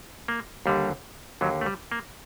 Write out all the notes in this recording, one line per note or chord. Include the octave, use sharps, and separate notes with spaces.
A#3
D#2 D3 G3
D#2 D3 F#3
A3
G3
A#3